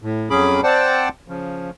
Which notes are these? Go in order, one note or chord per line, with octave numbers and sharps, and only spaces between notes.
A2
F2 F#3 C#4 G#4 B5 D6
C4 C5 D5 F#5 G5 A5
C#3 F3